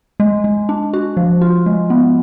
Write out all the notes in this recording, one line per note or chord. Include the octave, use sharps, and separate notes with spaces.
G#3
G#3
D4
F#4
F3
F4
G#3
B3